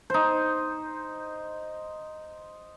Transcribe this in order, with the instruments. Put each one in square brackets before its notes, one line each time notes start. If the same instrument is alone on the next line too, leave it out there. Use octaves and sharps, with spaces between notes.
[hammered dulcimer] D#4 C5